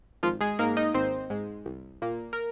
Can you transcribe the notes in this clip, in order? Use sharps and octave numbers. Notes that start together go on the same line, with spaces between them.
G#1 F3 F4
G#3 G#4
G#2 G#3 A#3 A#4
D#4 D#5
G#1 C4 C5
G#2 G#3
C2
A#2 A#3
A#4